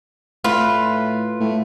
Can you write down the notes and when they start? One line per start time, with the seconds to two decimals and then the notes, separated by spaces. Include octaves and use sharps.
0.44 A2 F4 B4
1.40 A2